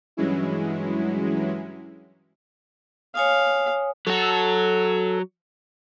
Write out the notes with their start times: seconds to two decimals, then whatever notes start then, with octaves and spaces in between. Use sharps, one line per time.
0.17 G2 E3 F#3 G#3 C#4 E4
3.15 C#5 F5 G#5 D#6
4.07 F#3 F#4 A4